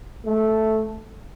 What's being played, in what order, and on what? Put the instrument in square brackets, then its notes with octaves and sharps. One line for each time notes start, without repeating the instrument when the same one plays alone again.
[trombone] A3